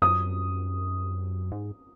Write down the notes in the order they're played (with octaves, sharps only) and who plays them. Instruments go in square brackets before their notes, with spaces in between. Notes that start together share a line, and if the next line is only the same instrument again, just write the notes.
[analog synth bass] F#2 [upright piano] D#6
[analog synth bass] G#2